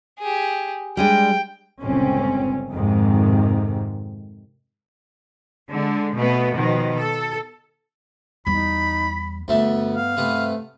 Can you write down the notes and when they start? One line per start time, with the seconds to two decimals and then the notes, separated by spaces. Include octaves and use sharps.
0.19 G4 G#4
0.97 G3 G#3 D4 G5
1.81 G1 C#2 G2 A#2 C4 C#4
2.70 F2 G#2 C3 D#3
5.70 D3 G#3
6.17 B2 A3 B3
6.55 B2 D#3 F3
6.97 A4
8.47 E2 G3 D#4 B5
9.48 D2 G2 A3 B3 E5
9.96 F5
10.17 C3 A3 B3